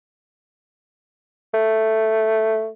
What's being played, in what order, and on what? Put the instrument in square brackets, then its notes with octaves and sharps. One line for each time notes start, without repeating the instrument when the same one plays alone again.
[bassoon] A3